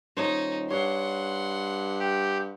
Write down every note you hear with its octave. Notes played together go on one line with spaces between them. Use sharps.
D#1 D#4 C5 C#5 D#5
G2 C#5 F#5 C6
G4